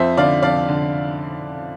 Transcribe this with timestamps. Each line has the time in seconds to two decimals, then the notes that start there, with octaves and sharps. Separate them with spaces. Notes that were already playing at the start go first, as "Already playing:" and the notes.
Already playing: F2 C5 E5
0.17 D3 D5 F5
0.42 F2 D5 F5
0.69 D3